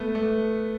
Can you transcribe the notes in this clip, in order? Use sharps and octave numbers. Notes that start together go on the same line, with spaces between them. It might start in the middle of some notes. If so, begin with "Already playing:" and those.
Already playing: A3 B3
A3